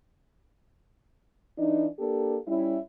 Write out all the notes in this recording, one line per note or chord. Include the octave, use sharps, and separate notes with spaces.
E3 D4 D#4
A#3 D4 G4 A4
G3 C#4 E4